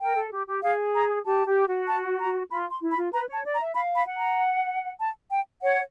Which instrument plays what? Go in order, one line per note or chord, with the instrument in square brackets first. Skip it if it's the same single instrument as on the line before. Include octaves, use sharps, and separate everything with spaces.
[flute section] A#4 [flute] G5
[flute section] A4
G4
G4
[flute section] G#4 [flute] F5
[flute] A#5
[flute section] G4 [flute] A5
[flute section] G4
F#4
[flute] A5
A#5
[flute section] F4 [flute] B5
[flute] C6
[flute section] E4
[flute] B5
[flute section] F4
[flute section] B4 [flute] A#5
[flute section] C#5 [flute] A5
[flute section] D5
[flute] A#5
[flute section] E5
[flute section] F5 [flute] B5
[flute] B5
[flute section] F#5
[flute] A#5
A5
G5
[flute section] C#5 [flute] F#5